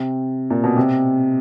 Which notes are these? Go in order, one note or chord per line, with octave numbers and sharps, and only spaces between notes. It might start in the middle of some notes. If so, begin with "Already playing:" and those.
Already playing: C3
A#2
B2
C3